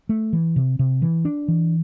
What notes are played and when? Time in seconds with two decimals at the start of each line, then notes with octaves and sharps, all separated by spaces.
0.09 A3
0.33 E3
0.56 C3
0.79 C3
1.02 E3
1.25 D4
1.48 E3